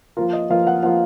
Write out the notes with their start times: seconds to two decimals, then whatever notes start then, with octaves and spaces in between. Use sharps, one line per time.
0.17 F3 A#3 F4 A#4
0.33 D#5
0.50 F3 A#3 F4 F5
0.67 F#5
0.83 F3 A#3 F4 F#5